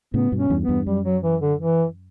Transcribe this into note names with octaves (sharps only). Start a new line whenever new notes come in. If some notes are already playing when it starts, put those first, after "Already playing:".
A2 C#3 B3
G2 B2
C#4
E2 G2
B3
E2 G2
F#2 G3
F#3
E3
D3
E3